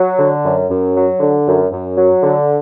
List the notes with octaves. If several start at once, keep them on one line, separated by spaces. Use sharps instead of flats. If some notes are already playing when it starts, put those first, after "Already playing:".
Already playing: F#3
D3
F#2
F#2
F#3
D3
F#2
F#2
F#3
D3